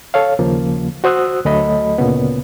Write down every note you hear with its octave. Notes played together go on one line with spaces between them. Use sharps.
A4 C#5 F5
D#2 C#3 F3 A#3
F#4 C5 D#6 E6 F#6
D2 F#3 A3 A4 D#5 B5
D2 A#2 C#3 B3